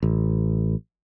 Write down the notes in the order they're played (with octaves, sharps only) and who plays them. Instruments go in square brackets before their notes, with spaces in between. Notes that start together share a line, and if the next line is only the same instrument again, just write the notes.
[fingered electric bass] A1